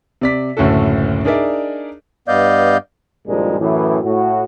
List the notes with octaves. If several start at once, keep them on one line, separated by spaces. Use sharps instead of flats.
C3 D5 B6
F#1 D2 A2 C#4 F#4 A4
D4 D#4 G#4 A#4 D5 E5
G2 B3 D5 D#5 F5 G6
G#1 G2 A#2 F3 G#3
F#2 A2 E3
A2 F#4